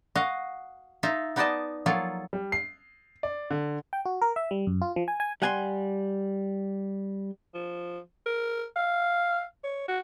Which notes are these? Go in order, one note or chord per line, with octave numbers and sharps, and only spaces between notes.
F#4 D#5 F5
D#4 F4 E5
B3 D#4 B4 D5 D#5 A5
F3 F#3 A#3 F4 G#4 A4
G3
C7
D5
D3
G5
F#4
A#4
E5
G3
F#2
F4
F3
G#5
G#5
G3 F#5 G#5 A5 C6
F3
A#4
F5
C#5
F#4